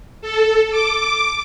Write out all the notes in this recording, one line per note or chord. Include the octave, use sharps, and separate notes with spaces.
A4
D6